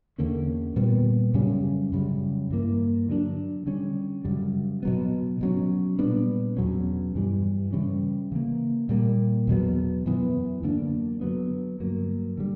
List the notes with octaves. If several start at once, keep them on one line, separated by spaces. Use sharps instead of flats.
E2 D3 A#3 C#4
A#2 G3 B3
F#2 C#3 G3 C#4
F#2 C#3 G3
G2 E3 A#3
D3 F#3 B3 D4
D3 G3 C#4
F#2 C#3 G3
B2 F#3 B3
B2 F#3 C#4
A#2 G3 B3 D4
E2 B2 F#3 C#4
G2 E3 G3
C#3 E3 G3 C#4
C#3 E3 A#3
A#2 G3 A#3
E2 B2 F#3 B3
F#2 E3 B3
F#2 D3 A#3 D4
D3 F#3 B3
G2 F#3 A#3
D3 G3